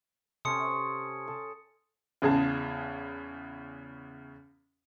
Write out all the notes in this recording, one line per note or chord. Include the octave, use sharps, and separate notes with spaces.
C3 C#4 A4 C6 D#6 C#7
A4
E2 C#3 G#4 A5